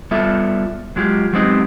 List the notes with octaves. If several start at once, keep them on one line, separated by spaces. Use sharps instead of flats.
G3 B3 F4 A4 E5
F#3 G#3 F4 G4
F#3 G#3 B3 C4 D#4 G4